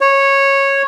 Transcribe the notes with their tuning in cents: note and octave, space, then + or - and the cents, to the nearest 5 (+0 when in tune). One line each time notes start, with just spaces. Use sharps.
C#5 -10